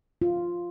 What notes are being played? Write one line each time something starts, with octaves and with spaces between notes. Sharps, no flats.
F4